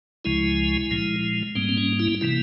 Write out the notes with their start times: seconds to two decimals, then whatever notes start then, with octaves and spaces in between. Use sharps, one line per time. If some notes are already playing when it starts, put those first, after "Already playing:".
0.25 C#2 C#3 F3 G#3 E4
0.91 A#2 F3 G#3
1.55 G#2 G3 A#3 C4
1.69 C4
1.77 C#4
2.00 E4
2.21 C3 E3 A#3 E4